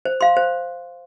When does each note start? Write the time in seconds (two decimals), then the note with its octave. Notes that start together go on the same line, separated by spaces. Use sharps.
0.05 C5
0.21 F5 C6
0.37 C5